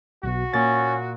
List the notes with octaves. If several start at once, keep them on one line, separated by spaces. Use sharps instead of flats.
B1 B2 F#4
A#2 C#4 A6